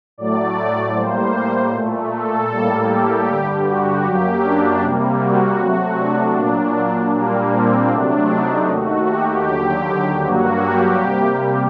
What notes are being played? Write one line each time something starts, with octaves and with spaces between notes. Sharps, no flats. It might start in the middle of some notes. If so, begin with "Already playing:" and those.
A2 F#3 A3 D5
A2 G3 A#3 C5
A#2 A3
A4
A2 G3 A#3
G4
G2 D3 G3
F#4
F#2 F#3 A#3 G4
D4
C3 G3 A#3
F#4
C3 F#3 A3 F#4
D4
A#2 F#3 A#3 D4
A#2 G3 A#3
C4
C3 F#3 A3 D4
D#4
D#2 D#3 A3 F#4
G4
D#2 D3 F#3 G4
G2 F#3 A#3 F#4
G4
C3 G3 A#3